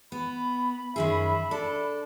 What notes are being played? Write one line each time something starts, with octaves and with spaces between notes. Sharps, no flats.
B3 B5
F#2 D#3 G#4 E5
D4 A4